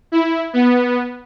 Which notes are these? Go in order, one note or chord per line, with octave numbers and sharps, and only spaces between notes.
E4
B3